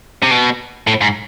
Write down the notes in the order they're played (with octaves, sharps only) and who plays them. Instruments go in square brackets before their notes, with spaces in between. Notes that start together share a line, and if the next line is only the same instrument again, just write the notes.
[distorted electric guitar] C3
B2
A2
G#2